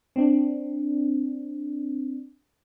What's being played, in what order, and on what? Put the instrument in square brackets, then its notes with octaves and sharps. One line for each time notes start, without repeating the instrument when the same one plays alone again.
[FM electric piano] C4 D4